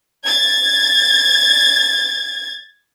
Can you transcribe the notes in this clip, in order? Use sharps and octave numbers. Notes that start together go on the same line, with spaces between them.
G#6 A6